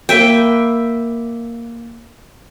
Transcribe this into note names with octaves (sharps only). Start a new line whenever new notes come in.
A#3 B4 E5 G5